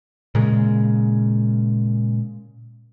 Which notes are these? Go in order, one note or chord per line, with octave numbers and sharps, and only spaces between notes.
A#2 C#3 G#3